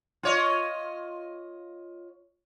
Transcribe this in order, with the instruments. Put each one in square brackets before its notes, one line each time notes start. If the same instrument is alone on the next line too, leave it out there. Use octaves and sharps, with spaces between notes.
[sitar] F4 C#5 D#5